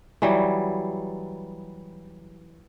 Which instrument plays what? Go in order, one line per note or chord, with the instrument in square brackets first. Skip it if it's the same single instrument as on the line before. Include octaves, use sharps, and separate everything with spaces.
[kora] E3 F#3 G3